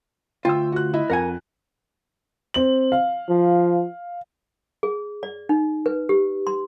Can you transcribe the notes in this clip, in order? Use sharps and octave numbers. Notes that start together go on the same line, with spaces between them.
D2 F4 G5 E6
F#4 F#6
E4 D#5 E5
F2 A#4 F#5 G#5
C4 F#7
F5
F3
G#4
D5
D#4
B4
G4
C6